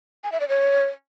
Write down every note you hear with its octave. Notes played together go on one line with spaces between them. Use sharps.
G#5
E5
D5
C#5